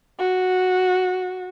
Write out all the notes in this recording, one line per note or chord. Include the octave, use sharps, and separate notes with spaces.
F#4